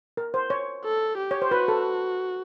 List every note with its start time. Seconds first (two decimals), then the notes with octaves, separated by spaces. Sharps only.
0.17 A#4
0.34 C5
0.50 C#5
0.85 A4
1.18 G4
1.31 C#5
1.42 C5
1.51 F#4 B4
1.68 A4